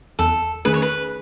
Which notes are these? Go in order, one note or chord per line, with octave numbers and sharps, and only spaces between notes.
E2 A4
D#3 A3 C#4 G#4 B4
C#5
B4